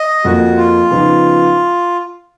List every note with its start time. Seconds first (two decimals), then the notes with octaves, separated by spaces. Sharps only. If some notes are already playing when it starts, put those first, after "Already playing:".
Already playing: D#5
0.24 F2 F3 A#3 F#4
0.57 F4
0.91 C#3 F3 B3 D#4